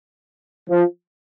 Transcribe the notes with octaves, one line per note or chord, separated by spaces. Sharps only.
F3